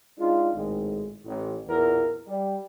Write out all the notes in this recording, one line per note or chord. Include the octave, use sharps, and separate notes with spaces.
G#3 D4 D#4 F4
G#1 A2 G#3
A1
B1 E2 A#2 E4 F4 A#4
G3